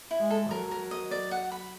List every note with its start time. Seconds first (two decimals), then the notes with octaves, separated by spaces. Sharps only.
0.11 E4
0.21 G#3
0.30 A4
0.51 F#3 A#4
0.71 A#4
0.91 D#5
1.11 D5
1.31 F#5
1.52 B5